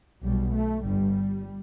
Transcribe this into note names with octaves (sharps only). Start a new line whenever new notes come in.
B1 B2 G3
A3
G1 G2 G3